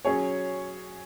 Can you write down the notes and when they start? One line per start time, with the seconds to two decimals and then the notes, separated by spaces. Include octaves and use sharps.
0.05 F#3 C#4 G#4 C#5